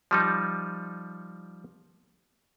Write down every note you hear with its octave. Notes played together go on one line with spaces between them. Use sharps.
F3 G3 D#4